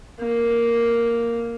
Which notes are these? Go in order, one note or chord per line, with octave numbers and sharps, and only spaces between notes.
A#3